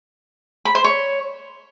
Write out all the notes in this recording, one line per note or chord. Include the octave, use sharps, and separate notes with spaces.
B5
C5
C#5